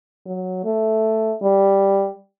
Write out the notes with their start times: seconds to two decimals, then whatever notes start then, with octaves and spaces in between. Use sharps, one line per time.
0.26 F#3
0.65 A3
1.42 G3